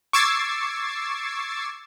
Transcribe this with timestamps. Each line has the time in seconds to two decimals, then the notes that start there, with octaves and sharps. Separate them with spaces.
0.13 C#6 D6 E6 G#6 A6 C7